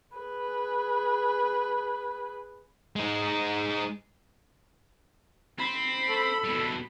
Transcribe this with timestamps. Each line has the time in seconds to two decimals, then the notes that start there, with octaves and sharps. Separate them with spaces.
0.17 G#4 B4
2.96 G#3 D#4
5.58 C4 B5
6.09 A4
6.44 B2 G3